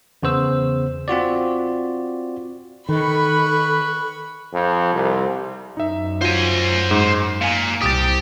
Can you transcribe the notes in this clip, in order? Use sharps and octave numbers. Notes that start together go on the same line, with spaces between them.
E2 C#3 B3 C5 E6
C4 F4 F#4 D5
D#3 A4 B4 B5 C#6
F2
C2
F#2 D#4 E5
F#3 F4 C5 G#5
G#2
A#2 F5 G#5
C2 G4 D#6 A6